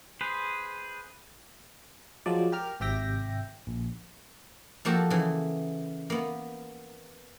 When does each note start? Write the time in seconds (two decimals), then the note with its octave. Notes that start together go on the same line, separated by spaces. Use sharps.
0.21 G#4 B4 C5
2.26 F3 F#3 G#3 D5
2.52 G4 A#4 F6
2.80 G#1 C3 G4 E5 G5 A#6
3.67 A#1
4.85 F3 A#3 F#4 G4 A4
5.10 C#3 E3
6.10 A#3 B3